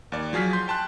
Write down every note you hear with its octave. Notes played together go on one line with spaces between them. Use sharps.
D#2 D5
F3 F#3 G#4 F6 B6
C6 G6
G5 A5 C6 F#6